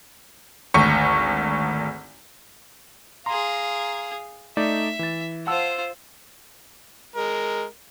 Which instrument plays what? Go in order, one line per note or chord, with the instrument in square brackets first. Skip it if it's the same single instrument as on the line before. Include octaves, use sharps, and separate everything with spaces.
[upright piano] G#1 D2 C#6
[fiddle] G#4 F5 [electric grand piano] A#5 C6
[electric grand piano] A3 D#4 D5 [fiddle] E5
[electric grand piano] E3 A6
[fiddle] F4 C5 [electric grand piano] F#5 A5 E6
[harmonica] G#3 A#4